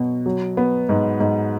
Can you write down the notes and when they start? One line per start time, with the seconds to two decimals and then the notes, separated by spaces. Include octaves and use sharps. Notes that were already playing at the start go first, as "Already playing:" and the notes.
Already playing: B2 F#3 F#4
0.26 F#3
0.57 B3
0.89 G#2
1.20 G#2